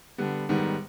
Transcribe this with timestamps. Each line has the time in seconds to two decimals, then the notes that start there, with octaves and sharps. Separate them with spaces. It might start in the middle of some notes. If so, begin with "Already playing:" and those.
0.18 D3 G3 B3
0.49 G#2 D#3 G3 B3